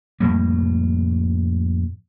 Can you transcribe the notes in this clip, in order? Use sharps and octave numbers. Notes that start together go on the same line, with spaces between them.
F2 A2 G3 A#3